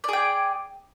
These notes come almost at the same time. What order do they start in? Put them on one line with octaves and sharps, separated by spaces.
D5 G#4 G5